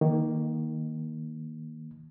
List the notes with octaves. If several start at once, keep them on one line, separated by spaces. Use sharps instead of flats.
D#3 A#3